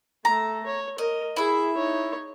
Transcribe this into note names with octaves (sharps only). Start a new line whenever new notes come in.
A3 A4 A#5
C#5
A#4 D#5
E4 G#4 E5
D#4 C#5